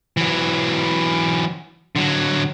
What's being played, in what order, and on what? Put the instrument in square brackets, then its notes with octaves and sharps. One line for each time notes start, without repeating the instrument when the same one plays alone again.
[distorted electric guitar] E3 F#3
D3 F#3